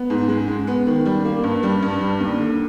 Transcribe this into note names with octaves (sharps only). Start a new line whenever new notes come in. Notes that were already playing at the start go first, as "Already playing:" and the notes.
Already playing: B3
G#2
G#3
G#3
B3
D#3
G3
A#3
G2
G3
G2
G3
D#2
D3